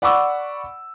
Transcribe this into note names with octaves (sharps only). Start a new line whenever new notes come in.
D5 F#5 B5 C#6 D6 E6